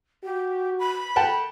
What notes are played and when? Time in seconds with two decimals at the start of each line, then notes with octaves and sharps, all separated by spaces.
0.24 F#4 G4
0.79 B5
1.16 A4 F#5 G5 A5